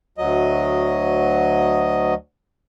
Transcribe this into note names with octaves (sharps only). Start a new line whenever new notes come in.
D2 F#3 D#5